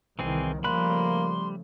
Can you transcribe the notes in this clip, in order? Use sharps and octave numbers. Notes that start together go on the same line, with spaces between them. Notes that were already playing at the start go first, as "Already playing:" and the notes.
C2 D#3 E3 C4 G#4
C#3 F3 G3 A3 A#3 B5 C6 F#6